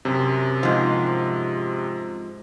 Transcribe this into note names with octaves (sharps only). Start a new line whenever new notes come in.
F#2 C3
G#2 F3